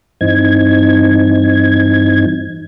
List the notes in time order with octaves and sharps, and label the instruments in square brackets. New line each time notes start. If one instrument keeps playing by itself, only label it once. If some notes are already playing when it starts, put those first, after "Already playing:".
[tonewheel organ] G2 E3 C4 D#4 G#6